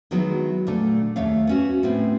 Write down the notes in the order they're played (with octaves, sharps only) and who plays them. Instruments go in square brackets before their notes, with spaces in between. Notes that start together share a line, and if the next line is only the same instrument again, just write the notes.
[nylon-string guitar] D#3 F#3 G#3 B3 E4
A#2 D3 A3
D#2 A3 C#5 E5 F5
B3 C#4 F#4
A2 B3 C4